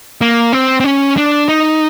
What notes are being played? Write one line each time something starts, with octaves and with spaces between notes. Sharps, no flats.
A#3
C4
C4
C#4
D4
D#4